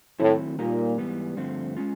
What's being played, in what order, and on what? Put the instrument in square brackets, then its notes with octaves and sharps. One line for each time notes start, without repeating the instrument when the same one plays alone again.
[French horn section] A2 [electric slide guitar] D#3 F#3 A3 C4 E4
[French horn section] A#2 [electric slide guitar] G3 A#3 D#4 G4 A#4
[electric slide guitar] G#2 E3 G3 B3
G2 D3 F3 A3 C4
G#3 C#4 F4